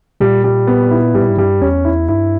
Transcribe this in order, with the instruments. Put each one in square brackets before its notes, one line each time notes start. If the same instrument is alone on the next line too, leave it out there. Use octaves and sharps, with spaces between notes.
[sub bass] A#2 [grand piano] G3
[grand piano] G3
B3
E4
[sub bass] G#2 [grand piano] G3
[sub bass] A#2
G#2
[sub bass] G2 [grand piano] G3
[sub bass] E2 [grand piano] C#4
[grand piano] E4
[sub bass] G2 [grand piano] E4